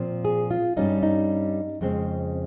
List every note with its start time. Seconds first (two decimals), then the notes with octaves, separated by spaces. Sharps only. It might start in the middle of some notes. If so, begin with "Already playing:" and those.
Already playing: A#2 F3 C4
0.25 G#4
0.50 F4
0.77 G2 G3 C#4 D#4
1.03 D#4
1.81 F2 C#3 G#3 C4